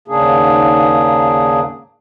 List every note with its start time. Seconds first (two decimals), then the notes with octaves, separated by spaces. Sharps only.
0.08 D#2 G#2 C#3 A#3 D4 G#4